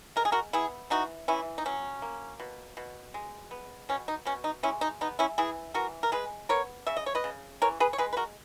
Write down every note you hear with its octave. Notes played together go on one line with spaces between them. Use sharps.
G#3 A#4
G#4
F#4 A#4
B3 E4 G#4
E3 D#4 F#4
E3 C#4 E4
D#4
F#3 C#4
A#3
B2
B2
G#3
B3
B2 C#4
D#4
B2 C#4
D#4
G#3 C#4 E4
D#4
B3 D#4
C#4 E4
E3 E4 G#4
E3 F#4 A#4
A#4
G#3 G#4 B4
B3 A#4 C#5
C#3 E5
D#5
C#5
B4 D#5
C#3
E3 A#4 C#5
G#4 B4
C#5
G#3 G#4 B4
B4
F#4 A#4